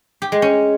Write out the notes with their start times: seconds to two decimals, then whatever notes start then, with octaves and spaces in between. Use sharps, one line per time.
0.22 G4
0.32 G#3
0.42 C#4